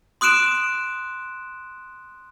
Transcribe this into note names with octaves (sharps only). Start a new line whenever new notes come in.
C6 D#6 F#6 D7 E7